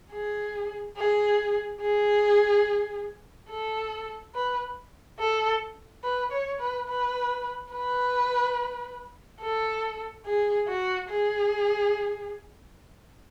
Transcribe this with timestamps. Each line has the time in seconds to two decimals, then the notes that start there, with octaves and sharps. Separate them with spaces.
0.13 G#4
0.97 G#4
1.82 G#4
3.50 A4
4.35 B4
5.20 A4
6.04 B4
6.32 C#5
6.60 B4
6.88 B4
7.73 B4
9.41 A4
10.26 G#4
10.68 F#4
11.10 G#4